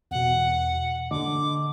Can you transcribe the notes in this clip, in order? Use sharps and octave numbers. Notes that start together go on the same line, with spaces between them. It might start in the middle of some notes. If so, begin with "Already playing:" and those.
E2 B2 F#5
D3 D#5 D6